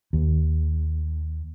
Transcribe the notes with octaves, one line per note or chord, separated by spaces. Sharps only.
D#2